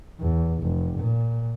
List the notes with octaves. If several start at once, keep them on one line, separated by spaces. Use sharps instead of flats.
E2
F1
A#2